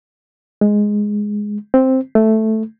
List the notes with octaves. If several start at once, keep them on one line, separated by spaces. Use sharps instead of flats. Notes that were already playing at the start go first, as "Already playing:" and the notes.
G#3
C4
A3